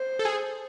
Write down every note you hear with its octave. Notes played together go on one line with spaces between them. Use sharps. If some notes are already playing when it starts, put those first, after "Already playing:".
Already playing: C5
A4
G#4